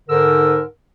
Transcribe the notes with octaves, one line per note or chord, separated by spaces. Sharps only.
G#2 D3 A#4 E6